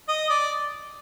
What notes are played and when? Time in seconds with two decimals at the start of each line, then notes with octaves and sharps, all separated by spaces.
0.09 D#5
0.30 D5